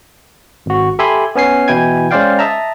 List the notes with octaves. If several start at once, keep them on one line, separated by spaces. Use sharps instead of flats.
G#1 F#4
G4 A4 E5 G#5 B5 C6
B3 C#4 G#5 C7
B2 E3 E4 G5 G#5 G#6
G#3 C#4 C5 D5 F5 G5
D#5 E5 A5 A#5